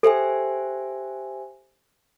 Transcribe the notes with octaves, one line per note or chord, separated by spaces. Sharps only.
G4 A4 C5 E5 G#5